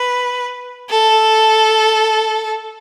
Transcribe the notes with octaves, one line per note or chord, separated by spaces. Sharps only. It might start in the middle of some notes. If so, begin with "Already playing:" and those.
Already playing: B4
A4